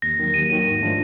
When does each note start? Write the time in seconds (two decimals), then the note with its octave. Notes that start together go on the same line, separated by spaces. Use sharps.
0.02 D#2 A#6
0.19 D#3 F#3
0.34 D#2 D#7
0.49 D#3 F#3 D#7
0.65 G#2
0.81 F3 A3 D4 F4